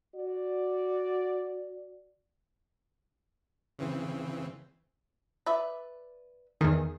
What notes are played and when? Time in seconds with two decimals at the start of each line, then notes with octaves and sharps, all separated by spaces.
0.14 F#4 D5
3.79 C#3 E3 C4
5.46 B4 D5 E5
6.61 E2 D#3 G#4